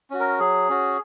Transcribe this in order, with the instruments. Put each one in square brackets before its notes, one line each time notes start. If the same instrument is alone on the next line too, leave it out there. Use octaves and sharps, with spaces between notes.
[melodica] C#4 F#4
A#4
F#3 G#4
C#4 F#4